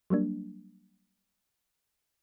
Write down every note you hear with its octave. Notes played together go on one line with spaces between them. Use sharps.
F#3 G3 A#3 D4